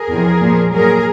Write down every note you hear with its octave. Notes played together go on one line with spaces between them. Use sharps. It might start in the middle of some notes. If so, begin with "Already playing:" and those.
Already playing: G#4 A#4
E2 C3 F3
A#2 F3
A#2 F#3 G#4 A#4